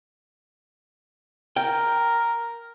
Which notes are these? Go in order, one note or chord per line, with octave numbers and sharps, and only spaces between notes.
A#4 G5